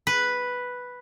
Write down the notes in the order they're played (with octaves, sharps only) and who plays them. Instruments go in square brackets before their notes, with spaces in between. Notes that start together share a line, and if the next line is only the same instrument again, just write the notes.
[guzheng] B4